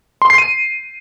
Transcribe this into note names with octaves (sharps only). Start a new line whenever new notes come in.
C6
C7
D#7